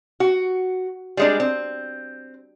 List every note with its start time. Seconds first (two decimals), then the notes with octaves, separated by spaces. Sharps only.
0.20 F#4
1.17 G3 G#3 D4
1.40 C4